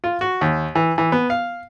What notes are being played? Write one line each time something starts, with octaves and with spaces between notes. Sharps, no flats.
F4
F#4
D#2
E3
E3
B3
F5